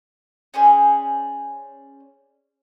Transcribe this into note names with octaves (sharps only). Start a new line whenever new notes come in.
C#4 G#4 C5 D5